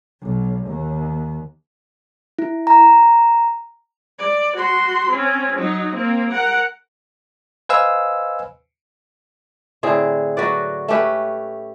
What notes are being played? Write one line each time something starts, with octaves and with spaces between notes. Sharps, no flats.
B1
D#2
E4
A#5
D5
F#4 C6
C4 C#4
F#3 D#4
A#3 C4
A#4 F#5
B4 C5 D#5 F5 G#5 E6
A2 D3 C4 G#4
F#3 F#4 B4 D5
A3 C#4 G4 B4